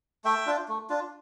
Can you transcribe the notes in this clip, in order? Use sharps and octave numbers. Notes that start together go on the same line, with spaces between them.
A3 E5 G5
D4 F4
A3
D4 F4